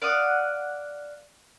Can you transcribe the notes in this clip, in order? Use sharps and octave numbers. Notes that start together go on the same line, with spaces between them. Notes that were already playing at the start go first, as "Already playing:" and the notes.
D5 F5 F#5 D#6